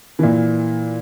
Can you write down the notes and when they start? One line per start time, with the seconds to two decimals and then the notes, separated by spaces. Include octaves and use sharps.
0.19 A#2 E3